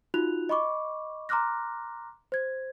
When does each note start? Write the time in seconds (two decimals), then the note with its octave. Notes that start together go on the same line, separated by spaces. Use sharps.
0.14 D#4 F4 F#4 F#6 F7
0.49 D#5 B5 C#6 D6
1.29 A#5 C6 D6 F6 F#6 A#6
2.32 C5 G#6